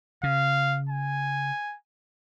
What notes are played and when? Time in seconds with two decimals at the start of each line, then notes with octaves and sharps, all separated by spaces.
0.23 C#3 F5
0.89 G#5